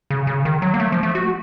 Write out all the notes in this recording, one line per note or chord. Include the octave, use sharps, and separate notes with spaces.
C#3
C#3
D#3
F#3
A#3
A3
F3
A3
F#4